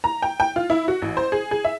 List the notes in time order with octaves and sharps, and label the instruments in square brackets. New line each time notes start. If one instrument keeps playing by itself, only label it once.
[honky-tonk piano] A#5
G5
G5
F4
E4
F#4
A1
C5
G#4
G#4
E5